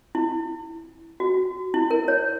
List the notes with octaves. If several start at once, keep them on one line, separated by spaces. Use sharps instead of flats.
E4
F#4
E4
A#4
C#5